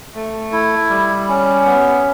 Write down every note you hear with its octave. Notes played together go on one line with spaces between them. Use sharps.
A3
E4
G3
C#4
B3